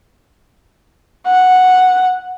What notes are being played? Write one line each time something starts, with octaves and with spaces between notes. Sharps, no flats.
F#5